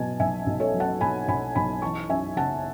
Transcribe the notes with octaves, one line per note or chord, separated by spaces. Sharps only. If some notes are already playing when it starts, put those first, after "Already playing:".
Already playing: B2 F#3 G#5 A5
B1 E5 G#5
B1
A4 C#5
F#3
F#5 A5
B2 G#5 B5
B1 G#5 B5
B1 G#5 B5
E3 A5 C#6
F#2 E5 G#5
F#1 F#5 A5